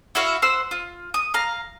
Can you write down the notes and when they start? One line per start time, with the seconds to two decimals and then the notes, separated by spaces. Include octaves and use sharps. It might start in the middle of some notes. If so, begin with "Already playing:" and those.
0.15 E4 F#4 E5 F5
0.42 C5 F#5 E6
0.71 F4
1.14 D#6
1.34 F5 A#5